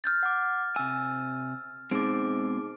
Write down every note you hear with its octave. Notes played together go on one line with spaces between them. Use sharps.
F6 G6 A6
F#5 D6
C3 G#5 E6
B2 G#3 C4 D#4 G#4 D6 D7